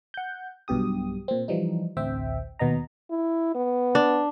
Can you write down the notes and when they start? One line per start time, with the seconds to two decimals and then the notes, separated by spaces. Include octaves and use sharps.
0.14 F#5 G6
0.68 B1 G2 B2 G4 D#6
1.28 A#2 C4
1.48 E3 F3 G3 D#4
1.97 A1 D2 C4 E5 G5
2.59 D#2 B2 B3 D#5 A#5
3.11 E4
3.55 B3
3.95 D4